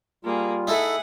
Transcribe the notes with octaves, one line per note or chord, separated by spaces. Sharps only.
G3 A#3 F4 G#4
D#4 E4 G#4 A4 E5 F#5